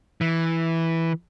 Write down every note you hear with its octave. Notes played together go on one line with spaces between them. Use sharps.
E3